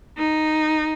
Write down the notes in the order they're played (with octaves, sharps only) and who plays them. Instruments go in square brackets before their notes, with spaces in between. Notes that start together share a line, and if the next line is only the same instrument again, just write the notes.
[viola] D#4